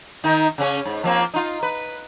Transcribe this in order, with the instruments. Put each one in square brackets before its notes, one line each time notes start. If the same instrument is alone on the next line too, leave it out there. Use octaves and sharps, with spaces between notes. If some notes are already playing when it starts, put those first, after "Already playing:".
[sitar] D#3 D#4
C#3 C#4 C#5
G#2
F3 A#3 C4
D#4 F4
B4